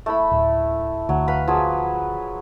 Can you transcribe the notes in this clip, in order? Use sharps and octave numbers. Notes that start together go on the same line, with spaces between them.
A3 E4 B5
D1
D2 F#3
B4 F5 B5
F3 F#3 G#4